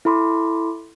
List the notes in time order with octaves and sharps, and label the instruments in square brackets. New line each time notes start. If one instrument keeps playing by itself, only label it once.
[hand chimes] E4 A4 B5 C6 D6